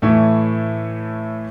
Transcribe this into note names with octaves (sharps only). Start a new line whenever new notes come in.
A2 E3 A3 C#4 E4